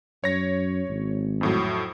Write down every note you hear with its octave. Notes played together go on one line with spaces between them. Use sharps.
F#2 C#5 A#6
G#1
F2 A2 F#3